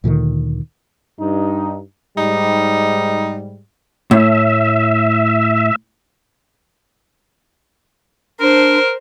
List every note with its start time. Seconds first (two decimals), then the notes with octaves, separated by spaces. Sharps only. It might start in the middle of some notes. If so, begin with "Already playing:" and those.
0.04 D2 A#2 D3 D#3
1.20 G2 D#4
2.18 G#2 G3 D#4
4.11 A2 E5
8.41 D4 A#4 C5